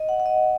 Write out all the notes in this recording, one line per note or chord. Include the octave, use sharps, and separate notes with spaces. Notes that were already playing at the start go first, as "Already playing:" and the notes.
Already playing: D#5
F#5
F#5
D#5